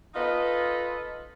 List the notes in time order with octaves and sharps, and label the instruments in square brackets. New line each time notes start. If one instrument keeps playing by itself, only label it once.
[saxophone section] D#4 F4 A4 B4 D#5